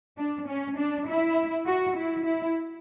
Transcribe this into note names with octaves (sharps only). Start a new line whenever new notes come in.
D4
C#4
D4
E4
F#4
E4
E4